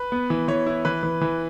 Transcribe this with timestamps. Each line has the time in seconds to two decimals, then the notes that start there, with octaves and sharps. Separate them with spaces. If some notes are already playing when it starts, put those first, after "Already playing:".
Already playing: B4
0.12 B3
0.30 E3
0.48 E3 C#5
0.67 E4
0.85 E3 B4
1.03 E3
1.21 E3